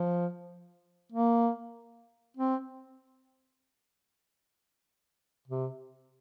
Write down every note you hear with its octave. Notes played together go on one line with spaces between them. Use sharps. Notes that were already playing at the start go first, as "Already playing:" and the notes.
Already playing: F3
A#3
C4
C3